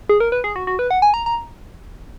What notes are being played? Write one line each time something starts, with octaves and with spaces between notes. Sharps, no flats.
G#4
A#4
B4
G#4
F#4
F#4
B4
F#5
G#5
A#5
A#5